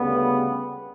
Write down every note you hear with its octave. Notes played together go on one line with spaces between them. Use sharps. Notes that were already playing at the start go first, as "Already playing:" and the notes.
Already playing: D2 C#3 G3 B3